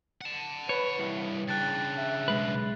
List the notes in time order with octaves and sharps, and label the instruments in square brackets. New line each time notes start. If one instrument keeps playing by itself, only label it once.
[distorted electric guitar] F#5 A5
[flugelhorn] B4 [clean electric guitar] C#5
[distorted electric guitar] C2 G2 [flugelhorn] E4
[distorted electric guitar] C#3 D4 [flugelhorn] G5 [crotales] F#6 A6
[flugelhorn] E5
[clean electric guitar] B1 G#3 B4